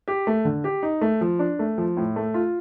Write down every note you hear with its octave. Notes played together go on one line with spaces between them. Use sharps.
G4
A3
D3
G4
D#4
A3
F3
D4
A3
F3
A2
A3
F4